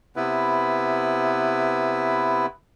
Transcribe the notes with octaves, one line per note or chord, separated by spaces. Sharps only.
C3 B3 E4 B4